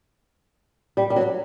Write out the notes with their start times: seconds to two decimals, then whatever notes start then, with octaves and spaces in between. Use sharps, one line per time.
0.97 G3
1.10 G3
1.16 F#3